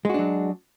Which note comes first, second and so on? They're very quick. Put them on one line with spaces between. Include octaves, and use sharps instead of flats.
G#3 F#4 D4 F#3